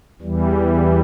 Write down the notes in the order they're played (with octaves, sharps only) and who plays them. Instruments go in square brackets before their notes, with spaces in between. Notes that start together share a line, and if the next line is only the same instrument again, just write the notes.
[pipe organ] E2 E3 G3